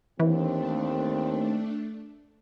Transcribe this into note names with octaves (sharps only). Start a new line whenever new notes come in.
D#2 E3 A3 C4 D4